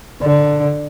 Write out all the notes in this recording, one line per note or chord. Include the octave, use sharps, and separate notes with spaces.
D3